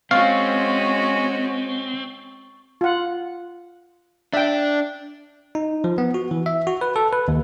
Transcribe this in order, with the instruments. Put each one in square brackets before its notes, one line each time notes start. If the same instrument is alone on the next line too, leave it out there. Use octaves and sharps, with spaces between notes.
[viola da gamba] G#3 C#4 F#4 [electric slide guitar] C4 [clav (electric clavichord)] F5 [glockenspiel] C#6 A6
[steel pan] F4 F#5
[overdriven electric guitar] D4 [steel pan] E5 G5
[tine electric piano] D#4
F3
B3
F#4
E3
E5
F#4
B4
A4
B4
D#2